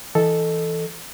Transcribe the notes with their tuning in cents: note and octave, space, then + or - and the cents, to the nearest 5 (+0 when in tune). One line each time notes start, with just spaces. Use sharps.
E3 +0 A4 +0 D#5 -5